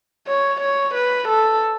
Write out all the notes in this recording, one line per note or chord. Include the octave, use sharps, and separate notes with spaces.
C#5
C#5
B4
A4